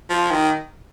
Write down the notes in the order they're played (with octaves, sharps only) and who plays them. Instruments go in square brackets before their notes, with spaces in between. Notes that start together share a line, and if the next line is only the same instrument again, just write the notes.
[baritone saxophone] F3
D#3